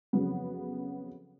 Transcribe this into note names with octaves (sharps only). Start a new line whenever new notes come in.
F2 C#3 F#3 B3